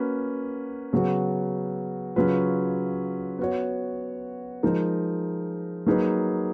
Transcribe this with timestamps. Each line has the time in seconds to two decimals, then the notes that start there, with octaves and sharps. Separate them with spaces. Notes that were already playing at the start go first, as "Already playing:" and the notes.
Already playing: A#3 C#4 F#4 B4
0.93 C#3 F#3 B3 F#4
2.16 C#3 F#3 C#4 F4 B4
3.39 B3 F#4 C#5
4.63 F3 G#3 D#4 A#4
5.87 F#3 A#3 D#4 G#4 B4